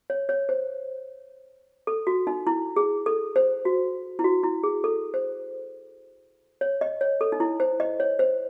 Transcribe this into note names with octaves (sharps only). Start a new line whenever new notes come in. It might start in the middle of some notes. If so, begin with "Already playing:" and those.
C#5
C#5
C5
A4
F#4
D#4
E4
G#4
A4
C5
F#4
E4
F#4
E4
G#4
A4
C5
C#5
D#5
C#5
A4
D#4
E4
C5
D#5
C#5
C5